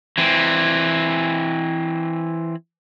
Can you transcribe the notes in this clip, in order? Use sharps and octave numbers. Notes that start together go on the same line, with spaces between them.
E3 C4